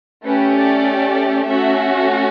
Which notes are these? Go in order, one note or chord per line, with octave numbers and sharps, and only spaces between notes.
A3 C#4 G4 B4
D5
A3 C#4 F#4 E5